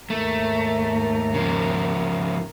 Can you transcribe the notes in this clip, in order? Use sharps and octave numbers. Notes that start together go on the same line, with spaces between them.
D#2 G#2 A3 A#4
C#3 F3